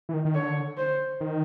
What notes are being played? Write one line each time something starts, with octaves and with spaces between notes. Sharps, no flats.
E3
D#3
D#3
D3 C#5
C5
D#3